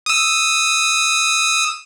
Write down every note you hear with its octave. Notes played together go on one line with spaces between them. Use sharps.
D#6 E6